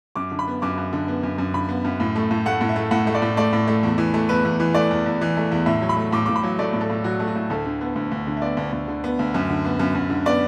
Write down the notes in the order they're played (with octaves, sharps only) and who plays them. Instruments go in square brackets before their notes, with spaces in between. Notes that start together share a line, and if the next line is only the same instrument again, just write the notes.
[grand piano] F#2 D6
D3
B5
B3
F#2 D6
F#2
D3
B3
F#2
F#2
D3 B5
B3
F#2
A2
A3
A2
A3 F#5
A2
E5
A3
A2 F#5
A3
D5
A2
A3 D5
A2
A3
E2
E3
A3
E2 B4
E2
E3
A3 D5
E2
E2
E3
A3
E2
A2 E5
F#3
B5
A3
A2 D6
A2 D6
B5
F#3
A3 D5
A2
A4
A2
F#3 F#4
A3
F#4
A2
D2 A4
D3
B3
D2
D2
D3
E5
B3 D5
D2
D2
D3
B3
D2
F#2
D3
B3
F#2
F#2
D3
B3 D5